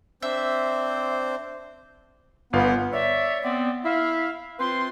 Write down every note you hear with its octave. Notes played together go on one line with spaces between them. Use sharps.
C4 D4 C5 E5
G1 B3 F4 F5
C#5 D5 E5
B3 C4 D5
E4 E5 F5
C4 F4 B4 C5 C6